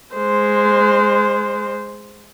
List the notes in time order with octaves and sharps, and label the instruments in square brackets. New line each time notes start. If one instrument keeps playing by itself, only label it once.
[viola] G#3 C5